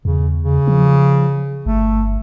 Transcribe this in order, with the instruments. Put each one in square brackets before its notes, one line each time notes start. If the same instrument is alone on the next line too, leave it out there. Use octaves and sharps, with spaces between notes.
[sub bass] E2 [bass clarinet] C#3
[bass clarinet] C#3
[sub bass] F3
[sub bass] G1 [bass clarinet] A3